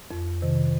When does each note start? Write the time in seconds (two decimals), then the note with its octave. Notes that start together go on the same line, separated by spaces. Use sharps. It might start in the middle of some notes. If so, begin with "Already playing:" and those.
0.11 F2
0.42 C3 D#3